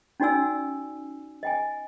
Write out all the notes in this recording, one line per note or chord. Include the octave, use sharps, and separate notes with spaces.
C#4 D#4 F#4 D5 G#5 E6
D#5 G5 G#5